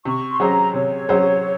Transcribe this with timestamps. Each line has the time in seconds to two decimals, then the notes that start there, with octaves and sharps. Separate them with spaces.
0.05 C3 C#6
0.31 C6
0.40 F#3 C#4 G#4 C5 A#5
0.74 C3 C#5
1.09 F#3 C#4 G#4 C5